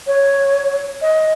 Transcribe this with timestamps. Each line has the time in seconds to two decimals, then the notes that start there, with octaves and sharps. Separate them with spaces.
0.07 C#5
1.02 D#5